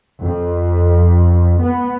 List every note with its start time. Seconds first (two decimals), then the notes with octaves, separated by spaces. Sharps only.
0.22 F2
1.63 B3